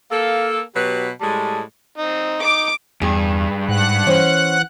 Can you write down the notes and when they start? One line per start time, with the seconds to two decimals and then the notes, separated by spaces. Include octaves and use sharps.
0.11 A#3 A4 F5
0.75 B2 F#3 G4 B4
1.21 A2 G3 G#3 A5
1.98 C4 D#4
2.42 D#4 D6
3.01 E2 G2 G#4
3.69 G#2 F#5 F#6
4.07 E3 C#4 C5